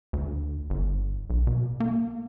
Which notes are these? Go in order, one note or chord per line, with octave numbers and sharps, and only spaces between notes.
D2
G1
B1
B2
A#3